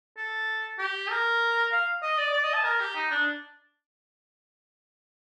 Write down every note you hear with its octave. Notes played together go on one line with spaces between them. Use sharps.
A4
G4
A#4
F5
D#5
D5
D5
D#5
A5
A#4
G4
D#4
D4